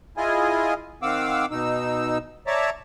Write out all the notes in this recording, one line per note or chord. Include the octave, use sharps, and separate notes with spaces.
E4 F4 G#4 D#5 G#5
D#3 C4 F5 F#5 D6 E6
B2 D#4 E6
C#5 D5 E5 A5 A#5